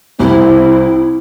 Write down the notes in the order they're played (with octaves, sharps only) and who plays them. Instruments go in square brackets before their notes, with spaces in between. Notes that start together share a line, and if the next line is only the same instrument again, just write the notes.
[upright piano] C2 [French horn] C4 [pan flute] E4